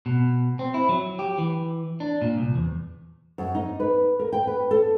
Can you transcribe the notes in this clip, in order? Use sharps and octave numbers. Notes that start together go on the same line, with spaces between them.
B2
C4
E4
F#3
G4
E3
D4
A#2
C2
E2
F#2
D#4
B4
A#4
G5
B4
A4